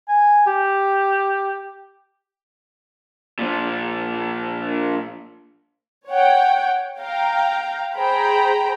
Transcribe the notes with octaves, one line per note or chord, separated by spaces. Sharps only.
G#5
G4
A#2 F3
C#5 F#5 G5
F5 G5 A#5
G#4 C5 G5 A#5 B5